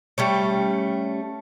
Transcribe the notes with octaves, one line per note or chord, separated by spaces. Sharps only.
G3 A3 C#4